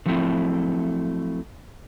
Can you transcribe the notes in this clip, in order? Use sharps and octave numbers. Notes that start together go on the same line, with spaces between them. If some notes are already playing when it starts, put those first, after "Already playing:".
D3 F3 F#3 A3 C4 E4